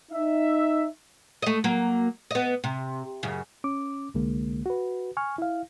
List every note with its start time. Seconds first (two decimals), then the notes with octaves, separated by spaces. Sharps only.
0.12 D#4 E5
1.42 A3 D#5
1.64 F#3 A#3
2.31 B3 D#5
2.64 C3
3.23 F#2 C#3
3.64 C#4 D6
4.14 C2 D3 G#3 A#3
4.66 F#4 B4
5.17 G#5 C#6 F6
5.38 E4 F5